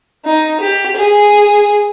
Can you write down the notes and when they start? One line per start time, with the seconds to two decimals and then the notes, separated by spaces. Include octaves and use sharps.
0.25 D#4
0.60 G4
0.96 G#4